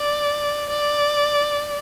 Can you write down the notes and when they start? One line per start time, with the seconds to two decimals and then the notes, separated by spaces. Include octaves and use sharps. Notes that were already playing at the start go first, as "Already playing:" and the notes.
Already playing: D5
0.70 D5